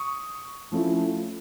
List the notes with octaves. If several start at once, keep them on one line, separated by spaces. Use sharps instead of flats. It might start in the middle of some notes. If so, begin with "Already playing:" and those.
Already playing: C#6 D#6
F3 A3 C#4 E4